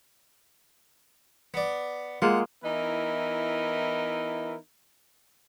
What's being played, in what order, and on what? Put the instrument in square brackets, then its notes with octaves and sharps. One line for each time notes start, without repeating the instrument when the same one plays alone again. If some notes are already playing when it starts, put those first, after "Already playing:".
[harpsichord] B3 D5
[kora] G#3 A#3 F4 [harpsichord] F#5
[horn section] E3 B3 D#4 E4 A#4